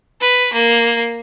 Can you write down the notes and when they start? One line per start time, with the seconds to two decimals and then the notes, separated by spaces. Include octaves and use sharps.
0.20 B4
0.53 A#3